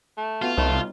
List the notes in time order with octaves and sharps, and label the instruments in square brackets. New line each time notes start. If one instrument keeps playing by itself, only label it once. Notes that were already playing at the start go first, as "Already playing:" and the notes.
[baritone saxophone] A3
[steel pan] B3 F#4 [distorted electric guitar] F4
[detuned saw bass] C2 [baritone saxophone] A3 [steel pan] D#4 B4 C#5
[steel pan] G3